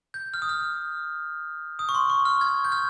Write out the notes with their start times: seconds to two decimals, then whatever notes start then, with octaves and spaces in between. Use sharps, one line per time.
0.14 G6
0.34 F6
0.42 D#6
0.49 F6
1.79 D#6
1.89 C#6
1.95 C6
2.10 C#6
2.25 F6
2.41 F6 G#6
2.65 G6
2.72 F6 G#6